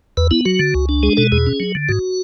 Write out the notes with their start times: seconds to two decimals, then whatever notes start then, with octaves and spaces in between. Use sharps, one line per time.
0.17 E2 B4
0.31 B3 E4
0.45 F#3 F#4
0.59 D3
0.75 C#2
0.89 D4
1.03 G#3 G#4
1.17 B2 A4
1.32 E2 G#4
1.47 C#4
1.60 F#3
1.75 D3
1.89 G#2 F#4